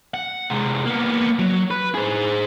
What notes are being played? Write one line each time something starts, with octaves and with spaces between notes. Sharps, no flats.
F#5
C3 G#3
A#3 B3
F#3
B4
G#4 C5